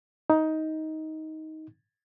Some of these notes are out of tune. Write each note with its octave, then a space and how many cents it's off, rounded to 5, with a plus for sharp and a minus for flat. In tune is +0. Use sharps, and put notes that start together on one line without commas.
D#4 +15